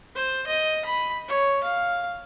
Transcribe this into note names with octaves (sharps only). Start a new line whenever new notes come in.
C5
D#5
B5
C#5
F5